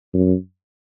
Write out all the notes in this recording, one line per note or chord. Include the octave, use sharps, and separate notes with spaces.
F#2